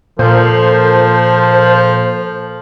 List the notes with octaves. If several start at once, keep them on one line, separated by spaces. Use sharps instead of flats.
A#2 F3 A4 C5